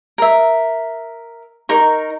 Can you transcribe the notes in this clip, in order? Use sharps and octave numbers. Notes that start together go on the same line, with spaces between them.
A#4 E5
D#4 A#4 C#6